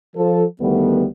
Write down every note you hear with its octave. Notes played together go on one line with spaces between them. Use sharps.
F3 A4
D2 D#3 G3 A3 B3